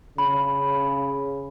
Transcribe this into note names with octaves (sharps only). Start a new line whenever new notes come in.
C#3 B5